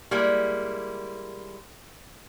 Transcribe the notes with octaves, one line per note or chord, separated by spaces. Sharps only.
G3 G#3 A#3 E4